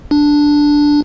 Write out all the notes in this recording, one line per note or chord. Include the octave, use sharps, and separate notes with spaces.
D4